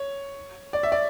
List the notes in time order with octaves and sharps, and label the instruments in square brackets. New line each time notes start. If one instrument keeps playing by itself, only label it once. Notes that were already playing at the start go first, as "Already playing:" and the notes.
Already playing: [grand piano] C#5
D5
E5
D5